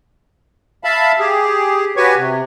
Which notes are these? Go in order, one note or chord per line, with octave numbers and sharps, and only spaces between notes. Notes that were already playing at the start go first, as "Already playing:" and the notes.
E5 F5 A5 B5
G4 G#4
F#4 G4 B4 C#5 G#5 C#6
C3